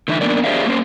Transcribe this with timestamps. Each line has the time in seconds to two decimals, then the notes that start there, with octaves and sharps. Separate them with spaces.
0.08 D3 E3 D#4 E5
0.21 A#3 B3 D4 A#4 D5
0.44 G4 G#4 C5 D5 E5 F5
0.66 A#3 C#4 C5